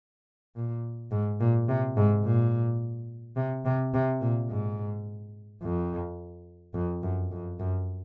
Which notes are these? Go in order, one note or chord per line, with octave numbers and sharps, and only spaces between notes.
A#2
G#2
A#2
C3
G#2
A#2
C3
C3
C3
A#2
G#2
F2
F2
F#2
F2
F#2